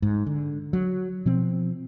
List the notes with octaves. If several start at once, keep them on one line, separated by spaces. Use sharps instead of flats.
G#2
D3
F#3
B2 F3 C4